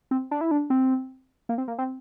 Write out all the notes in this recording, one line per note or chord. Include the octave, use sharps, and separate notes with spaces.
C4
D4
E4
D4
C4
A#3
C4
A#3
C4